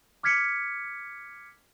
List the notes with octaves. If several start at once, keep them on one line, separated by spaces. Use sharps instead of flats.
D6 F6 G#6 B6 C#7